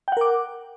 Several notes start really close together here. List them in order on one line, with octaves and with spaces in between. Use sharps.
G5 F#5 A#4 D6